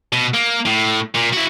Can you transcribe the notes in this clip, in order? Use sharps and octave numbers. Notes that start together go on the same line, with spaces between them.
B2
A#3
A2
A#2
E4 F#4